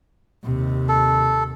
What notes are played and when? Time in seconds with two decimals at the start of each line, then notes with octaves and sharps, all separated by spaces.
0.44 D#2 C3
0.89 A4